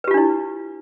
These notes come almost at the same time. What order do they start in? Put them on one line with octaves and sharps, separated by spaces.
B4 G4 F4 D4 E4